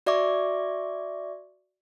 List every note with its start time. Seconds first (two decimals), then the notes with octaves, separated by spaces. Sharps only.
0.06 F#4 D5 E5 C#6 D6